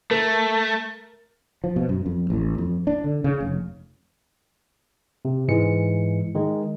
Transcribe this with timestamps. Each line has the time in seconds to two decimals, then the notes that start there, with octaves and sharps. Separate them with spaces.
0.11 A3 A#4
1.64 F3
1.76 B2
1.89 F#2
2.06 F2
2.30 A1
2.58 F2
2.87 D4
3.04 D3
3.24 C#3
3.40 F1
5.25 C3
5.48 G#2 E3 G#3 C#7
6.35 D#3 G#3